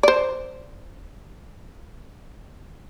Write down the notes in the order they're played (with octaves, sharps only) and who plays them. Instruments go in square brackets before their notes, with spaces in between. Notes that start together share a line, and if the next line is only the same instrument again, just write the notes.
[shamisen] C5 D5